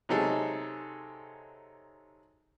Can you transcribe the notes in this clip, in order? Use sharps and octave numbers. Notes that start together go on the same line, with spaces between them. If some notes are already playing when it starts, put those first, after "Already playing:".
C3 F#3 G#3 D#4 G#4 A4